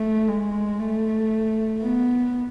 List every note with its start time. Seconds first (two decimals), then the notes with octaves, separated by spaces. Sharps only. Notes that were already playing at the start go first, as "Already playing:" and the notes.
Already playing: A3
0.28 G#3
0.80 A3
1.83 B3